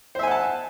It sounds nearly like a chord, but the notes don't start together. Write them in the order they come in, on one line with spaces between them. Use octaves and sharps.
C5 E5 G#5 F#5 A5